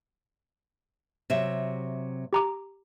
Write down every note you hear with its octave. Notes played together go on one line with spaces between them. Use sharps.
C3 F#3 E5
G4 A#5 D6